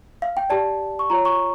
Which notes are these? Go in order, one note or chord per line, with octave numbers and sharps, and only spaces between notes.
F5
G5
G4 D5 A5
C#6
F4 C#5 A#5
C#6